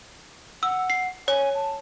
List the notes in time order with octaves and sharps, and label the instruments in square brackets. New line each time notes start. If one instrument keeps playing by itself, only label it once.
[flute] F#5 [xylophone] E6
[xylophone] C7
[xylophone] C#5 [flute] G#5
[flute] A5